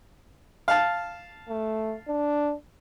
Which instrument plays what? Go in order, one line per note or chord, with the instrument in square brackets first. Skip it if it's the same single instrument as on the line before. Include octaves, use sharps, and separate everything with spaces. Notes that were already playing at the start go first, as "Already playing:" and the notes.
[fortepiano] F5 A5
[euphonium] A3
D4